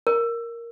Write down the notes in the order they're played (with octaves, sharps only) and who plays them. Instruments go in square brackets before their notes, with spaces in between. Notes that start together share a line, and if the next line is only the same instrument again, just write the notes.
[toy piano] A#4